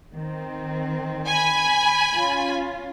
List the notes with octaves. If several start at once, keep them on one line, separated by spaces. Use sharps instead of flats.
D#3 C4
G#5 B5
C#4 F4